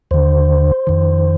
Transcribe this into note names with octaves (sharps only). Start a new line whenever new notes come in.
D#2 D3 C5
F2 D#3